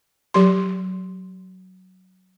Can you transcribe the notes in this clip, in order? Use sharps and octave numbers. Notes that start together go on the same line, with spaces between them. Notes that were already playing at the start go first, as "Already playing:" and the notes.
F#3 G4 C6